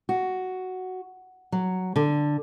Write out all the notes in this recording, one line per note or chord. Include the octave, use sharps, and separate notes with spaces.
F#4
F#3
D3